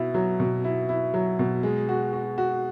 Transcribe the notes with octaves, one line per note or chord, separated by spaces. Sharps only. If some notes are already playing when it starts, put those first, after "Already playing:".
Already playing: B2 E4
F#3
B2
E4
E4
F#3
B2
G#3
F#4
F#4
F#4